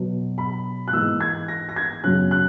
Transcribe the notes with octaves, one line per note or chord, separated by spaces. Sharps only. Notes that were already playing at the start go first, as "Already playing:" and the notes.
Already playing: B2 F#3 B3
B5
F#6
G#2 E3 A#3 D#4 E6
G#6
A#6
A#6
G#6
F#2 C#3 F#3 C#4 F#6
F#6